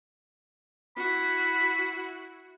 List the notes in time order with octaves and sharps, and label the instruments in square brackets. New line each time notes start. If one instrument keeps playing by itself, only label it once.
[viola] E4 F#4 [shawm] B5